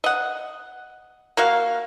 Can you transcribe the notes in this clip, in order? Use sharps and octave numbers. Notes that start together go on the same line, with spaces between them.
D#5 F#5
A#3 F#4 F5